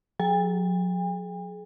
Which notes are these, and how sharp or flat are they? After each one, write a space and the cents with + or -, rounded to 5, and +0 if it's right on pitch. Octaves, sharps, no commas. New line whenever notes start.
F#3 -40 G#4 +30 G5 +45